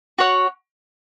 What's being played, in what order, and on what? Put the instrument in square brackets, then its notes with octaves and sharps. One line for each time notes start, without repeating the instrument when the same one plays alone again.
[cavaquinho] F#4 C#5 F#5